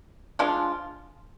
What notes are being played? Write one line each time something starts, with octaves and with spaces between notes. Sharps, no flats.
F3 G#3 D4 F4